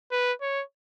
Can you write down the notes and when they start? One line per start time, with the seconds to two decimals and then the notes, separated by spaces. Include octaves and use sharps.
0.11 B4
0.41 C#5